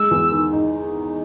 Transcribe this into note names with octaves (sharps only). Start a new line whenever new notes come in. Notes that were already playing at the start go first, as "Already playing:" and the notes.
Already playing: G#3 E6
E2
D#3
D#4